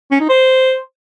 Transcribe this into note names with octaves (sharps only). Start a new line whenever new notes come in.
C#4
D#4
C5